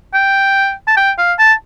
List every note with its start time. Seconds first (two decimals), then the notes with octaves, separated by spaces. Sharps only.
0.14 G5
0.87 A5
0.97 G5
1.18 F5
1.39 A5